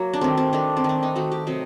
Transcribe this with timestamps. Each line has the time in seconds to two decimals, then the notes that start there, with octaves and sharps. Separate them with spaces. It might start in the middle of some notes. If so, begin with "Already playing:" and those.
Already playing: F#3 A#3
0.14 D4
0.21 D#3 A3 C4
0.37 C4
0.53 D#3 A3 D4
0.77 C4
0.84 D#3 A3 D4
1.03 D#4
1.16 D#3 A3 F#4
1.32 G4
1.47 C3 F#3 A3 D#4